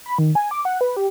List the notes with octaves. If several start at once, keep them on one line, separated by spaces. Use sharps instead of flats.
B5
D#3
G#5
D6
F#5
B4
G4